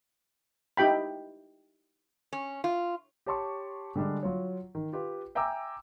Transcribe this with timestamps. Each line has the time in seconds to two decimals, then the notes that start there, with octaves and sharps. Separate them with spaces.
0.77 D#4 E4 G4 G5 B5
2.33 C#4
2.64 F4
3.26 G4 C#5 A5 C6 C#6
3.96 D3 G3 G#3 D4
4.23 F#3 F4 C#5
4.75 D#3
4.93 F4 G4 B4
5.35 E5 G5 G#5 A#5 D6 E6